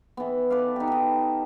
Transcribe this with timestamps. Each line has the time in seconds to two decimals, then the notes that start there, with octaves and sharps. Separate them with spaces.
0.17 E3 B3
0.50 A4 B4 D5 F5
0.76 D#4 G4
0.88 D#5 A5